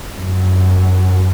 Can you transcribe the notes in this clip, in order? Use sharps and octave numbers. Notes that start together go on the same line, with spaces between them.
F#2